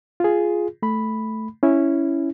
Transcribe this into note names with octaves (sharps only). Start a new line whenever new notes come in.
F4 G#4
A3 B5
C#4 E4